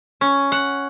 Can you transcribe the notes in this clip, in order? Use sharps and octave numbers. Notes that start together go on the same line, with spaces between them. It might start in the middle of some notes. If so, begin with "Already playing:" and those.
C#4
F#5